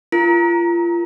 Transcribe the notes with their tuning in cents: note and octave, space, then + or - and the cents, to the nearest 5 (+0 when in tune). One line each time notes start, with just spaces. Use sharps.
F4 -30 A#4 +5 A#5 +0